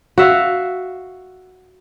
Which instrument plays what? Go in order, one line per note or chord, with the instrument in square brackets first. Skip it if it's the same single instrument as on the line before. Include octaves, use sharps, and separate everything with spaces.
[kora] F#4 E5 F5